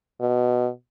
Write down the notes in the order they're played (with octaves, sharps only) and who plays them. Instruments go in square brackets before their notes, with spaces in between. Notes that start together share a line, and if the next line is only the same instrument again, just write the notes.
[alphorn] B2